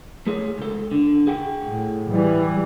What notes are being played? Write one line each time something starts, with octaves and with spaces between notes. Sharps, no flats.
A3 G#4 C#5
C#2 A4
D3
G#4 F#5 G5
A2
E3 G3